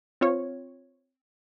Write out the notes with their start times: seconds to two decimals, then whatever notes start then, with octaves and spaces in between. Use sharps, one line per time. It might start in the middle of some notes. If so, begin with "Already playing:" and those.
0.21 C4 F4 C#5